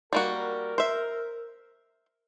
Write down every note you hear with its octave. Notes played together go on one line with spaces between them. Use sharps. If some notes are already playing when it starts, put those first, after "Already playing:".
G3 A#3 F#4 A#4
C5 E5